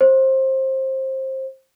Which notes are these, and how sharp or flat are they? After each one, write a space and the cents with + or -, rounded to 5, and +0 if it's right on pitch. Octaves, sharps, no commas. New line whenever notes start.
C5 +20